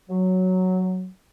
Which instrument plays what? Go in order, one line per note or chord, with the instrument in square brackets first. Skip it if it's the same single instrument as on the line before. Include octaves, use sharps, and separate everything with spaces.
[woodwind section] F#3